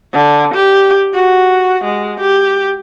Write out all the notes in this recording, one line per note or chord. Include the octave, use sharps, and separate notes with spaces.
D3
G4
F#4
G#3
G4